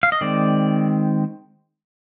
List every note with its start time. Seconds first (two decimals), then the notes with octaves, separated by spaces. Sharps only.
0.03 F5
0.12 D#5
0.21 D#3 G#3 C4 D5